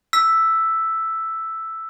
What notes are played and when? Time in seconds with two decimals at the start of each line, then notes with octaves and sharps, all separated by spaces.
0.13 E6 B6